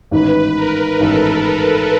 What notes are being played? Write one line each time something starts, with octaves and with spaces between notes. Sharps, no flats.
A1 G#2 D#3 B4
A#4
A1 G#2 D#3 A4